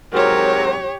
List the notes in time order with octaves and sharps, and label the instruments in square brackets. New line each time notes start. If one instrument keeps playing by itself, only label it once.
[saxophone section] G#2 C3 F#3 [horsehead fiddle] G4 C#5 [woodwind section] A#4